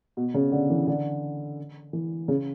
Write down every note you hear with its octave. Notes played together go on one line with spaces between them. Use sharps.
B2
C#3
D3
E3
D3
E3
C#3